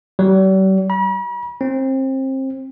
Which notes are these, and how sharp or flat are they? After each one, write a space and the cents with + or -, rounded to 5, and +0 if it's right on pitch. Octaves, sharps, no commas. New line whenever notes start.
G3 -45
B5 -45
C4 +25